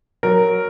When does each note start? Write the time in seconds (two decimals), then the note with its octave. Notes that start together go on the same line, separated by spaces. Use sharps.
0.23 F#3 A#4